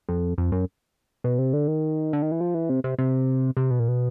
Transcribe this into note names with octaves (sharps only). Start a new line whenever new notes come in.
F2
F2
F#2
B2
C3
D3
D#3
D3
D#3
E3
F3
E3
C3
C3
C3
C3
B2
A#2
B2